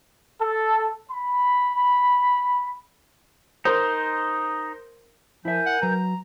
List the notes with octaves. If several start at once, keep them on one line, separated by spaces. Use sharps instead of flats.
A4
B5
D#4 A#4 C5
F3 E4 A#4 E5 G#5 G6
F#5
F#3 B4 A#5